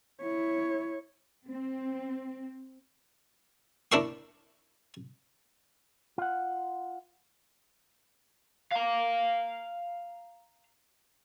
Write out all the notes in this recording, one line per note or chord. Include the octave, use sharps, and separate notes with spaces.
E4 C#5
C4
D4 E4 A#4 C6 C#6
F4 F#5
F5 A#5